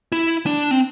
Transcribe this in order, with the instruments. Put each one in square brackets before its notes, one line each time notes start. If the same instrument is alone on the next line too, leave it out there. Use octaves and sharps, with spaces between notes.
[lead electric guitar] E4
D4
C4